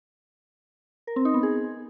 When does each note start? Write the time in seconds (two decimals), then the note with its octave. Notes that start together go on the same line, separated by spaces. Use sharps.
1.07 A#4
1.16 C4
1.25 D#4
1.34 B3
1.43 G#4